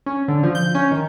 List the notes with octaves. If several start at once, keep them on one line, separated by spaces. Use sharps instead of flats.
C#4
D3
F3
G6
C#4
D#3